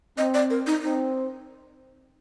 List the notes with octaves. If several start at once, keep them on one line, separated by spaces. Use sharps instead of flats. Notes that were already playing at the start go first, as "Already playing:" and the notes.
C4 D#5
D5
A#4
D#4
C4 D#4